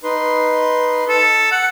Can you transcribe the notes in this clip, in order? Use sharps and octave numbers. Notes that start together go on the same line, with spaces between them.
D#4 B4 C6
A4
F#5